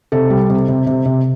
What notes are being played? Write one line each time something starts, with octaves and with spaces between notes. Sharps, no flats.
C3 A4
G3
C3
C3
C3
C3